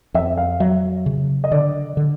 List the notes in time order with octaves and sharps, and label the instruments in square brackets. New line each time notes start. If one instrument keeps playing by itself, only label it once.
[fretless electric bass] F2 [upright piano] E5
[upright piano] F5
[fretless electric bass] F#3 [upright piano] E5
[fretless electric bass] C#3
[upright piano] D#5
[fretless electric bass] D3 [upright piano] D5
[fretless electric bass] D3